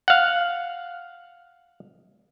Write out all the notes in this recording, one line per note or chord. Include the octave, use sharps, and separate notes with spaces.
F5 F#5